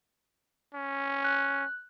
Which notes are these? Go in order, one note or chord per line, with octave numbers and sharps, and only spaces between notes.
C#4
F#6